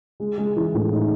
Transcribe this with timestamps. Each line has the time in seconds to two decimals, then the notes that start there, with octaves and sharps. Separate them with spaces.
0.20 G#3
0.38 G#3
0.56 E3
0.74 A2
0.92 D#4